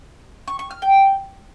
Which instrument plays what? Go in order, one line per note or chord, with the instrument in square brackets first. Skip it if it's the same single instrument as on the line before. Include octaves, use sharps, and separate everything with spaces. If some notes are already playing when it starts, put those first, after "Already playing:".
[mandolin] C#6
C#6
F6
G5